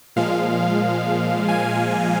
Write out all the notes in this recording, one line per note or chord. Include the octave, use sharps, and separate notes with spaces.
A#2 F3 G#3 F5
G#5